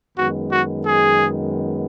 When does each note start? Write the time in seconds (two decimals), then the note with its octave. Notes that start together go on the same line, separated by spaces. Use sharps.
0.17 F#2 D#3 G#3 B3 F#4
0.51 F#4
0.86 G#4